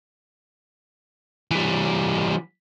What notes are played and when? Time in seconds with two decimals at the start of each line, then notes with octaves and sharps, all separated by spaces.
1.51 E3 G3